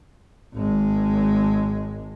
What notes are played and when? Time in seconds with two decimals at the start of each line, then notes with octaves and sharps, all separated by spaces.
0.54 G#1 G#3